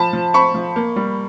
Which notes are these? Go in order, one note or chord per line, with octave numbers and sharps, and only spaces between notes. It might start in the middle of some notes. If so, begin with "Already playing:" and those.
Already playing: F3 A5 B5
F3
C4 B5 C#6
F3
A#3
G3